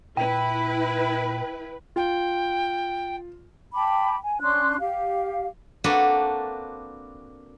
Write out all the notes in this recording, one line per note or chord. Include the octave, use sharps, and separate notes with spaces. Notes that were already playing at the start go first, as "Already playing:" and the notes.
A#2 E4 B4 G5
F4 G5
G5 A5 B5 D6
G#5
C#4 D4 C6 F#6
G4 F5
A#3 C4 D4 F#4 A4 B4